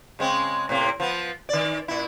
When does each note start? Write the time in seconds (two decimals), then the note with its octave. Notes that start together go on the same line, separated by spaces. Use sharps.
0.19 C#3 G#3 C4
0.69 A2 C3 A#3
1.00 F3 B3
1.49 D#3 D5
1.88 A#2 E4